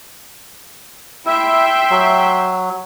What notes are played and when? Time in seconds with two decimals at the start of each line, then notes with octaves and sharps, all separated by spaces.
1.25 E4 E5 G5 C6
1.90 F#3